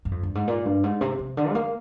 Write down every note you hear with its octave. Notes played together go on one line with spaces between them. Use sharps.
G2
F2
G2
G#2
A#2
G2
G#2
C3
C3
D3
G#3
A#3